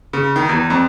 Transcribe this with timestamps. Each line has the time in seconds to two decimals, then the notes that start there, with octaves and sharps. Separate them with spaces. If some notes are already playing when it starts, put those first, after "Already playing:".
0.13 C#3
0.36 D#3
0.49 E2
0.70 F2